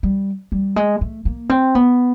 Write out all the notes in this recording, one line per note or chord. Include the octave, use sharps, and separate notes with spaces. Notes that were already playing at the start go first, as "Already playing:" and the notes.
G3
G3
G#3
A3
A#3
C4
B3